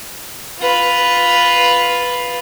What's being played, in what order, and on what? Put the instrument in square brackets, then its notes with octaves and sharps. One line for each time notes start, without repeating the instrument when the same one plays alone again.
[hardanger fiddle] F4 B4